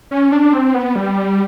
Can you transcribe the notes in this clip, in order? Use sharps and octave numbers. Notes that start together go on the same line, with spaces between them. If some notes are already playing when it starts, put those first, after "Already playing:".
C#4
D4
C4
B3
G3